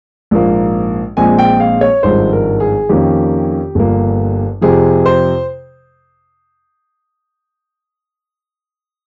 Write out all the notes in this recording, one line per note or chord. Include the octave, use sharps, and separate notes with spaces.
A#1 G#2 F3 A#3
A#1 A#2 F3 G#3 C4 G#5
G5
F5
C#5
G#1 G2 F3 G#3 C5
A#4
G#4
F2 D#3 A#3 C#4 G4
G1 G2 F3 A#3
F2 C3 F3 G#4
C5